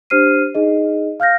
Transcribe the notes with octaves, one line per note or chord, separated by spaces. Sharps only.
D4 G4 C5 F6 C7 D#7
D#4 G#4 D#5
F5 F6 G6 A#6